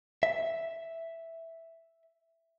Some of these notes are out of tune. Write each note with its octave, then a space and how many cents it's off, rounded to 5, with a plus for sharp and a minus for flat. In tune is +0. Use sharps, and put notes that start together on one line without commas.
E5 +0